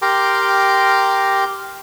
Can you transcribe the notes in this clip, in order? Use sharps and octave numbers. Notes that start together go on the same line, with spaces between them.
G4 A#4 G5 A#5 C6 D6